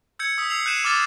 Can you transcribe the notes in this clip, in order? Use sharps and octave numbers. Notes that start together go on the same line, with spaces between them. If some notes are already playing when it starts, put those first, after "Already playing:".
E6 G6 G#6 C#7
D#6 E6 B6
E6 C7 F7 F#7
F#6 G6 C7 D#7 E7
D6 D#6 F6 A6 E7